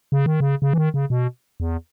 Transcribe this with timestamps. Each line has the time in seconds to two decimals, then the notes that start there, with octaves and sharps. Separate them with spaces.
0.12 C#3
0.26 D#3
0.40 C#3
0.62 C#3
0.73 E3
0.78 D#3
0.94 C#3
1.10 B2
1.60 E2